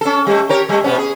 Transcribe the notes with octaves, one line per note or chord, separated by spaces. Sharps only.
C#4 A4
G3 A3
G4 A#4 C#5
G3 A3
B2 B3 C#4
G#4